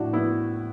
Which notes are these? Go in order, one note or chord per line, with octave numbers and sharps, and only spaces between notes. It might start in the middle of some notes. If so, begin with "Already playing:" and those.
Already playing: A2 D4 F#4
B3 E4